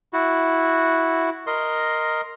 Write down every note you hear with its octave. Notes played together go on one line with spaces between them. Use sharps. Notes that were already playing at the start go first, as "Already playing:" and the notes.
E4 F#4
A#4 D#5 C6